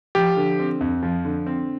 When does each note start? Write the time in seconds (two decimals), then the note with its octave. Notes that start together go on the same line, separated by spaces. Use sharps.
0.15 F3 G4
0.37 D3
0.59 C4
0.81 F2
1.03 F3
1.25 D3
1.46 C4